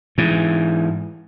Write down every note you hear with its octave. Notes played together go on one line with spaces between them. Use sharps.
G#2 E3